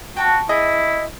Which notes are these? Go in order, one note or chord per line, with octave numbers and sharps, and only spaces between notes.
F#4 G5 A5 C#6
E4 G#4 D#5